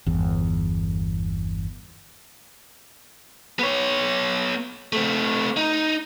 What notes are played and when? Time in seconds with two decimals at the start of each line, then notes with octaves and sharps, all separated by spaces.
0.06 G1 E2
3.59 B3 C#5
4.93 A3 C4
5.57 D#4